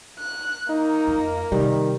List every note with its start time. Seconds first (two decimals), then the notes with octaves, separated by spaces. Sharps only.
0.19 F#6
0.69 A#3 D#4
1.07 F2
1.52 C3 D#3 G3